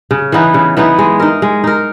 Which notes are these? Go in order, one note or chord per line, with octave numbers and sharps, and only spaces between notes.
C#3
E3 B3 D#4
C#3
E3 B3 D#4
G#3
D#4 A#4
G#3
D#4 A#4